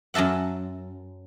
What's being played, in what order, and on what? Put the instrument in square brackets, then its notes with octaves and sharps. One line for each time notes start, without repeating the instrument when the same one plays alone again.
[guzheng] F#2 F#3 A4 E5 F#5